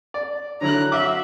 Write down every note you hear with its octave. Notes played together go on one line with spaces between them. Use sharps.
D5
D3 F#3 E4 A#5 F#6
F#4 E5 F5 D6